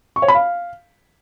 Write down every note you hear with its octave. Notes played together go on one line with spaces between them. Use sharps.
C#6
C#5
B5
F5